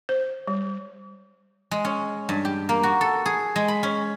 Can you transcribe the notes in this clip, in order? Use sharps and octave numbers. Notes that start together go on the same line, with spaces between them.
C5
G3
G#3
C#4
G2
G4
A#3
F#4
A4
G#4
G#3
B5
C#4